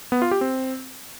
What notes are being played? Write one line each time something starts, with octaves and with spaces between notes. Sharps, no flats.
B3
F4
G4
C4